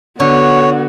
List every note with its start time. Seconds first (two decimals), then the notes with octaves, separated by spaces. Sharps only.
0.20 D3 B3 F#4 C#5